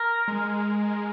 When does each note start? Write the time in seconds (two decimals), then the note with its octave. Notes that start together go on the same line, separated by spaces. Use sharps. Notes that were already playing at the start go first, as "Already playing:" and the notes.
Already playing: A#4
0.28 G#3